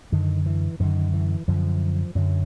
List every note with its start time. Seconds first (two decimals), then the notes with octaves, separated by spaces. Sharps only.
0.12 F#2 D3 D#3
0.46 E3
0.80 F#2 D3 D#3
1.14 E3
1.48 F#2 D3 F3
2.15 F#2 D3 F#3